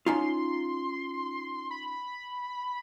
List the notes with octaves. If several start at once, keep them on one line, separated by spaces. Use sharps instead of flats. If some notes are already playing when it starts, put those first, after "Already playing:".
C#4 D#4 F4 C6
B5